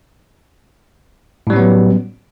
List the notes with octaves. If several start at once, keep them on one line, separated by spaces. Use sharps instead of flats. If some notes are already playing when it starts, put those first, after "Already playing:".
A2 F#3 G3 B3 C#4